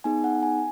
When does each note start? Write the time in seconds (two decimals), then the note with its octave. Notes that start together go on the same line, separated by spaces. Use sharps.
0.04 B3 D#4 G#4 G#5
0.24 F#5
0.43 G#5